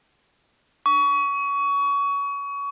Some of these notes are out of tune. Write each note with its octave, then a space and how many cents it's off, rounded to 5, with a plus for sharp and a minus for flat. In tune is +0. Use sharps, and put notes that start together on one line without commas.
C#6 +25